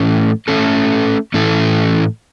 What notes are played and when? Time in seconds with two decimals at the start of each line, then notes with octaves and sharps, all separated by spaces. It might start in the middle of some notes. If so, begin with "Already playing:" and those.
Already playing: A2 E3 A3 C#4 A4
0.48 A3 C#4 A4
1.34 A2 E3 C#4 E4 A4